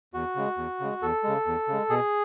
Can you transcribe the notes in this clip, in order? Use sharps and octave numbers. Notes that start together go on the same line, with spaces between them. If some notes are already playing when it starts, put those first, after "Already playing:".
E2 F#4
C#3 G#3
E2
C#3 G#3
E2 A4
C#3 G#3
E2
C#3 G#3
B2 G#4